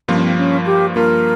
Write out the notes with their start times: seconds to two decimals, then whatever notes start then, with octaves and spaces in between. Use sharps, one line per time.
0.08 G2 F3 A#3 C4 F4
0.15 C#4
0.22 C4
0.37 C#4
0.66 G4
0.95 G2 F3 A#3 F4 A#4